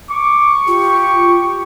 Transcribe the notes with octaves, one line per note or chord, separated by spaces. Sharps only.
C#6 D6
F4 G4